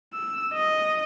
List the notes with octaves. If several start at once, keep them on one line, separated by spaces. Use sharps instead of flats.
E6
D#5